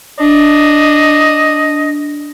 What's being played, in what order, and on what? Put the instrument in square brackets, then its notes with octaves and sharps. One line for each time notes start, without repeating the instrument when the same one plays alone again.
[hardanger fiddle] D4 [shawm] D#5